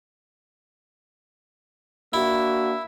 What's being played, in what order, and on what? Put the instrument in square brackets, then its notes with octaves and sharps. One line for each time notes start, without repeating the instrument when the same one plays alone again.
[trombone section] A#3 D4 F#4 [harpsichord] E4 [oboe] E5